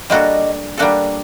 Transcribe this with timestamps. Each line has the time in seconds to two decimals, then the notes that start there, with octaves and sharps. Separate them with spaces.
0.10 G3 A#3 D4 F#4 A4 D#5
0.78 G3 A#3 D4 F#4 A4